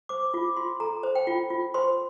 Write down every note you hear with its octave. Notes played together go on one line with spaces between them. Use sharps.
C5 D6
F4 D6
F4 C6
A4 A#5
C5
G5
F4
F4
C5 C6